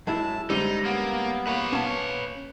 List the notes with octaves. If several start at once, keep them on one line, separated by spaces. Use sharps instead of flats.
F#2 G#3 E4 E5 A5
F#2 D3 G3 G#3 D#4 C5
A#3 B3
A#3 B4 C#5 F#5
C#4 A5